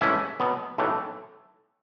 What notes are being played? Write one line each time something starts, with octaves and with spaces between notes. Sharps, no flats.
A1 G#2 E3 A3 C#4 E5 G#5
B2 F#3 B3
B1 A2 E3 A3